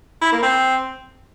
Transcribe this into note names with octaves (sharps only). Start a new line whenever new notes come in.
E4
A#3
C4